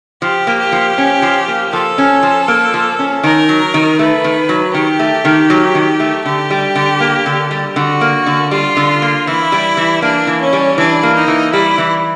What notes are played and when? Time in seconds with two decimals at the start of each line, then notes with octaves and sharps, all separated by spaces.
0.22 F3 G4
0.47 A#3
0.60 G4
0.72 F3
0.98 C#4
1.22 F3
1.48 A#3
1.72 F3 A4
1.98 C#4
2.23 F3
2.48 A#3
2.74 F3
2.99 C#4
3.23 D#3 A#4
3.49 F#3
3.74 D#3
3.99 A3 B4
4.24 D#3
4.49 F#3
4.74 D#3 G4
4.99 A3
5.25 D#3
5.50 F#3
5.75 D#3
6.00 A3
6.25 D3 G4
6.50 G3
6.75 D3
7.00 A#3
7.26 D3
7.51 G3
7.76 D3 F#4
8.01 A#3
8.26 D3
8.51 G3 F4
8.77 D3
9.02 A#3
9.27 E3 E4
9.52 G3
9.77 E3
10.02 A#3 D4
10.27 E3
10.40 C#4
10.53 G3
10.78 E3 D4
11.03 A#3
11.16 D#4
11.28 E3
11.53 G3 E4
11.78 E3